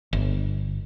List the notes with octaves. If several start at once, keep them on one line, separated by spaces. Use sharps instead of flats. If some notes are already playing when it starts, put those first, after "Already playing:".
G1